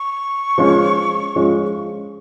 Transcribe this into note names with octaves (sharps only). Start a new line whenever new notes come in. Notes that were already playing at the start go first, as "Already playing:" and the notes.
Already playing: C#6
F3 G#3 C#4 F4
F3 G#3 C#4 F4